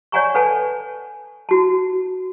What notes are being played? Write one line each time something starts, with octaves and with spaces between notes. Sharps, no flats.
C#5 D5 F#5 G#5 A#5 C#6
A4 B4 F#5 G#5 A5
E4 F#4 A5